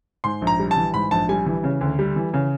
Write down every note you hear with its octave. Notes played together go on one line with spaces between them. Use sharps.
G#2 C6
A#1
A#5
G3
A5
E3
G#2 B5
A#1 A5
G3 G#5
E3
C#3
D2
G3
E3
C#3